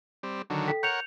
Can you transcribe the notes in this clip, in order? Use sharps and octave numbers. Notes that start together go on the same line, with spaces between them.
G3 C4
D3 D#3 F#3
A4 G5 B6
A#4 C#5 F#5 G6 C#7 F7